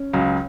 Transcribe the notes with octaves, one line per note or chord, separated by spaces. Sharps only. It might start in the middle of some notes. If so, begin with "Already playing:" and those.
Already playing: C#4
C#2 C#3 F#3